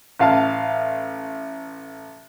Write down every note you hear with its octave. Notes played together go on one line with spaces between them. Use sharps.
A1 F5 A5